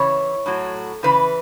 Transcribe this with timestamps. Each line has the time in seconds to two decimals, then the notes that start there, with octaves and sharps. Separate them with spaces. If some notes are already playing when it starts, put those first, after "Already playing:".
Already playing: C#3 E3 C#5
0.46 A2 F#3
1.03 C#3 E3 B4